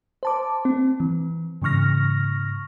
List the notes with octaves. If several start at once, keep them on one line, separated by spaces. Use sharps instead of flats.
C5 A5 D6
C4
E3
G#2 C#3 E3 C#6 F6 A#6